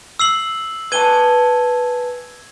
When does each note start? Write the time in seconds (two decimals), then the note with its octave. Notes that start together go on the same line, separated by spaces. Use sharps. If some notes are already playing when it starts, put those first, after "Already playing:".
0.19 E6 C7 F#7
0.92 B4 G#5 A5 G#6 D#7 G7